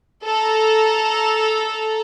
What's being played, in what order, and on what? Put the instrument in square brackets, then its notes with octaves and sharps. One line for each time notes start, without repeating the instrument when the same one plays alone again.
[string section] A4 A#5